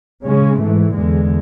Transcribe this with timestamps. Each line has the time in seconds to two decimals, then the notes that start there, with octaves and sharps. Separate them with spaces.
0.23 C#3 G#3 C#4
0.59 G#2 E3 A3
0.94 E2 D3 G#3